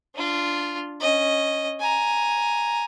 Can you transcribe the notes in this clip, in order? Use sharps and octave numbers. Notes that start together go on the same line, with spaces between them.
D4 F4
C#4 D#5
G#5 A#5